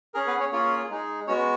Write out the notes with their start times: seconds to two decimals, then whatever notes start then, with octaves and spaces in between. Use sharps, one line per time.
0.14 C#4 G#4 A#4
0.27 B3 B4
0.40 C#4 C#5
0.52 A#3 C#4 F4 G#4 C#5
0.90 G#3 D#4 G#4
1.27 G#3 B3 C#4 F#4 C#5